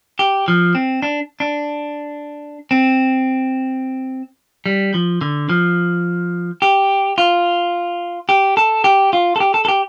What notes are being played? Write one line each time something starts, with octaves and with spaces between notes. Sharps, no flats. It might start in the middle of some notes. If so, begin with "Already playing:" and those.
G4
F3
C4
D4
D4
C4
G3
F3
D3
F3
G4
F4
G4
A4
G4
F4
A4
G4
A4
A4
G4